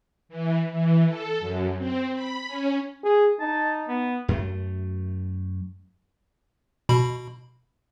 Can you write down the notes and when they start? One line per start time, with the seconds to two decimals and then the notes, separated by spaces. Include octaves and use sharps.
0.29 E3
0.72 E3
1.08 A4
1.40 F#2
1.78 C4
2.14 B5
2.47 C#4
3.03 G#4
3.40 D#4 A5
3.88 B3
4.28 F#2 A3
6.89 B2 B5